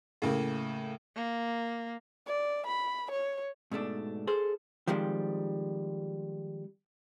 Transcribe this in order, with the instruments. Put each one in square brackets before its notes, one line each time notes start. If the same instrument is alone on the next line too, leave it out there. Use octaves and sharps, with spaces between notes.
[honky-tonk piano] A2 C#3 A#3
[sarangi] A#3
[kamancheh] D5
B5
C#5
[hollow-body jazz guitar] G#2 B2 A3 D4
G#4 A4 C5
D#3 F3 G3 G#3 C4